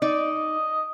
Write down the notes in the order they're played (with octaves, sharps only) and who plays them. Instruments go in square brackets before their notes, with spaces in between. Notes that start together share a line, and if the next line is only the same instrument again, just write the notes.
[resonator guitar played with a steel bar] D#4 D5 [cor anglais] D#5